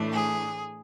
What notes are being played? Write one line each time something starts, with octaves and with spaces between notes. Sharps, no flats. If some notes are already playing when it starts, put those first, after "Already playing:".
Already playing: A2 E3 A3 D4
G#4